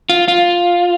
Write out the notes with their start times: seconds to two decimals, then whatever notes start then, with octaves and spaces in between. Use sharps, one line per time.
0.09 F4
0.28 F4